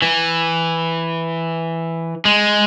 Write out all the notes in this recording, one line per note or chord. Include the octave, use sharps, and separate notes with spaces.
E3
G#3